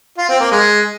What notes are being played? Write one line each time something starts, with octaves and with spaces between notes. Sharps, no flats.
F4
C4
A#3
G#3